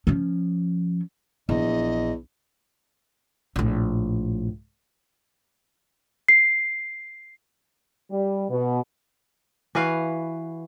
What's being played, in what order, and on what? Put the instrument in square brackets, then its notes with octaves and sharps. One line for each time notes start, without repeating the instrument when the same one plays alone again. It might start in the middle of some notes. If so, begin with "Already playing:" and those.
[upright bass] F3 C#4
[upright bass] A#1 [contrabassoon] E2 [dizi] D#5
[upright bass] A#1 A2
[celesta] C7
[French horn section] G3
B2
[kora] E3 F#4 B4 F5